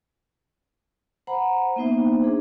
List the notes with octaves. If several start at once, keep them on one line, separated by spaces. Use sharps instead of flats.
C5 F#5 A#5 B5
A#3 B3 D#4 C5 E5
D4 G#4